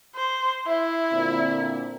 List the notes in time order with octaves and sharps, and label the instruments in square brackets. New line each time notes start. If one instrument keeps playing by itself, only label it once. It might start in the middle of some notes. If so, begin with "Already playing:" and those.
[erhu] C5
[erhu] E4 [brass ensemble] E5
[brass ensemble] A#2 D3 C4